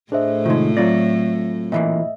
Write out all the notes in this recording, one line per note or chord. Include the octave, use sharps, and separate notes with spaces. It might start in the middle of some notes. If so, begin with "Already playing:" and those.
A2 A3 D4 G#4 C5 D#5 E5
C3 D#3 G#3 D#4 F4
F#3 C4 F4 D5 A#6
A#2 E3 A#3 D#5 E5